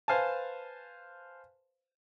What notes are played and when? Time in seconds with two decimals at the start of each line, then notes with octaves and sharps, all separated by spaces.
0.08 B4 C5 F5 G#5 A5